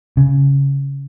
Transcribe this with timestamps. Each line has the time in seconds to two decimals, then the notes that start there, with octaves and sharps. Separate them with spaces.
0.17 C#3